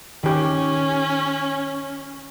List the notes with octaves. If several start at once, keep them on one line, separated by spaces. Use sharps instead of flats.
D#3 C#4 G4